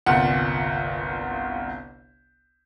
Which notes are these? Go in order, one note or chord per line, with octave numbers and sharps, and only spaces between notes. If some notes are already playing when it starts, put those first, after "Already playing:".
G1 C2 A#2 F#5